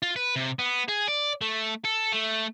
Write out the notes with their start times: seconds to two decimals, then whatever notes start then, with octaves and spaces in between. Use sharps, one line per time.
0.02 F4
0.16 B4
0.36 C3
0.59 B3
0.88 G#4
1.08 D5
1.41 A3
1.85 A4
2.12 A3